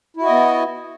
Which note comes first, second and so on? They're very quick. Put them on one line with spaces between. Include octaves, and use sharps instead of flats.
E4 F#4 D#5 B3